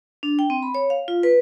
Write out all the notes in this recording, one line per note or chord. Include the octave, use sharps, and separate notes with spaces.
D4
G5
C4
B5
C#5
F5
F4
B4